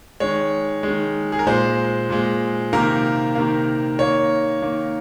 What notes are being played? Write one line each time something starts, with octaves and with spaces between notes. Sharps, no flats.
D#3 G#3 C#5
D#3 G#3
G#4
A#4
A#2 G#3 C5
A#2 G#3
C3 D#3 A#3 A#4
C3 D#3 A#3
D#3 A#3 C#5
D#3 A#3